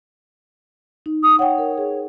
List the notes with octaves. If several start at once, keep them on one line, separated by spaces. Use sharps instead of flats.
D#4
D#6
C#5 F#5 G5
A#4
G#4